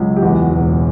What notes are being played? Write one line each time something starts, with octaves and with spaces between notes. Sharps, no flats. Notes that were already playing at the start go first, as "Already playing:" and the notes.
Already playing: C#2 F#3
G4
E2 F#4
E1